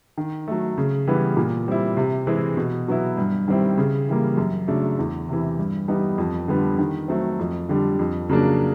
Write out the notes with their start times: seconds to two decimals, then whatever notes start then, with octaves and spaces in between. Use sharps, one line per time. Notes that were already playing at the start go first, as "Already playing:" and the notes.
0.17 D#3
0.48 F#3 A3
0.78 C#3
1.07 E3 G3 B3
1.37 A#2
1.68 G3 C4 E4
1.97 C3
2.27 E3 G#3 C4 E4
2.57 B2
2.88 F#3 B3 E4
3.18 G2
3.48 D#3 G3 C4 E4
3.78 C#3
4.09 E3 G3 A#3
4.38 F#2
4.68 C#3 F#3 A3 D4
4.99 E2
5.29 C3 E3
5.59 G2
5.88 E3 G3 B3 D#4
6.18 F2
6.48 D3 G3 B3
6.79 D#3
7.08 F#3 A3 C4
7.39 F2
7.69 D3 G3
7.99 F2
8.29 C#3 F#3 A#3 D4